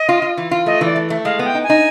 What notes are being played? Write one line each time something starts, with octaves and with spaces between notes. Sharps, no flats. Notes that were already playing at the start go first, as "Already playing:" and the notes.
Already playing: D#5
F4
F4
E3
F4
A3 D#5
E3 D5
A3
A3
G#3 F5
B3
G5
D#4
G#5
D#4